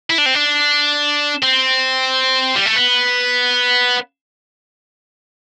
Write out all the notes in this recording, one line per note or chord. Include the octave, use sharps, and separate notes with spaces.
E4
D4
C4
D4
C4
G3
A3
B3